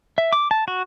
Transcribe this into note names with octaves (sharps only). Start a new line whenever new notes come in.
E5
D6
A5
F#4